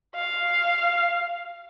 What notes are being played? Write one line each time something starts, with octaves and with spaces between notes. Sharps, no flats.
F5